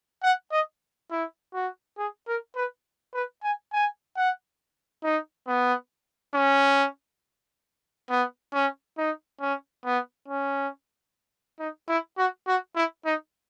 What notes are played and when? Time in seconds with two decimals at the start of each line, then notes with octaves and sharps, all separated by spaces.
0.23 F#5
0.52 D#5
1.11 E4
1.54 F#4
1.98 G#4
2.28 A#4
2.56 B4
3.14 B4
3.43 G#5
3.73 G#5
4.17 F#5
5.04 D#4
5.47 B3
6.35 C#4
8.10 B3
8.54 C#4
8.98 D#4
9.41 C#4
9.85 B3
10.29 C#4
11.60 D#4
11.89 E4
12.18 F#4
12.48 F#4
12.76 E4
13.05 D#4